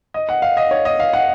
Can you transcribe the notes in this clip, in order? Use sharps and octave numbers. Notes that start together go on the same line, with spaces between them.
D#5
F#5
F5
D#5
C#5
D#5
F5
F#5